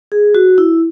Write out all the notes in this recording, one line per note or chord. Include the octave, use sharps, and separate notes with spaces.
G#4
F#4
E4